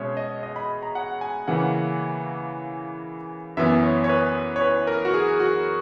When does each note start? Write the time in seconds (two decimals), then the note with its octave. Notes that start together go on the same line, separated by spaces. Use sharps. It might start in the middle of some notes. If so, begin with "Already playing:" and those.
Already playing: B2 G#3 C#4 C#5 E5
0.17 D#5
0.43 D#5
0.56 B5
0.83 A#5
0.95 F#5
1.21 G#5
1.48 C#3 E3 A#3 C#4 F#5
3.57 F#2 E3 B3 E5
3.83 C#5
4.04 C#5
4.09 B4
4.56 C#5
4.61 B4
4.87 A#4
5.05 F#4
5.14 G#4
5.40 F#4